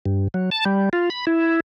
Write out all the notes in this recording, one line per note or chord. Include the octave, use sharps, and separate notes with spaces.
G2
F#3
A5
G3
F4
B5
E4